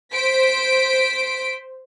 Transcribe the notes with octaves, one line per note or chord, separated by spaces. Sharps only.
C5 B6 D7